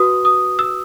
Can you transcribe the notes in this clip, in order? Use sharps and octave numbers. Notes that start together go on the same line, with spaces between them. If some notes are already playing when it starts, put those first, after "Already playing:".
Already playing: F#4 B4 D#6
D#6
E6